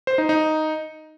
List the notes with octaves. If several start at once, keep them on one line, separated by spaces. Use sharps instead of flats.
C5
D#4
D#4